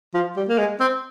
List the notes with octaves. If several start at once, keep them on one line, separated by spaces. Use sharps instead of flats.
F3
G3
A#3
G#3
C4